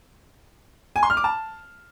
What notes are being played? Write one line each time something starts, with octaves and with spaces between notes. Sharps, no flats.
G#5
C6
F6
D6
A5